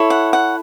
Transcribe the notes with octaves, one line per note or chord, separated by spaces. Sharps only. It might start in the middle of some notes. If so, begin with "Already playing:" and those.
Already playing: E4 A4 C#5
F#5
F#5